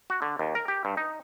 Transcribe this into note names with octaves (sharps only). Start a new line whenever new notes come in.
F#4
D3
D#2
A#4
G4
G2
D#4